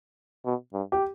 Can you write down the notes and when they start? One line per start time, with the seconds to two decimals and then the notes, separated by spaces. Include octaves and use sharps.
0.46 B2
0.73 G2
0.92 G4